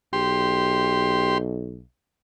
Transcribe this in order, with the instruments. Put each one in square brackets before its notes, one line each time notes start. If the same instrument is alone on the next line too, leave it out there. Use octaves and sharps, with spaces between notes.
[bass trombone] B1 [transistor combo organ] G4 C6